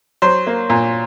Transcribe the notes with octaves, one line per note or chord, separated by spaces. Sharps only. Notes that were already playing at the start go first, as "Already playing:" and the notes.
F#3 C5
A#3
A#2